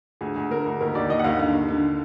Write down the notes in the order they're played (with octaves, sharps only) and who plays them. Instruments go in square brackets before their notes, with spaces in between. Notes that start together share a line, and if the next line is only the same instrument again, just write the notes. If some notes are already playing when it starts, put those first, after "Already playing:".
[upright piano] D2 G#4
D2 G#4
D3 A#4
D2
D#2 A#4
D#2 D5
D#2 D#5
F#5
D#2 F5
D3 F5
D#2
D3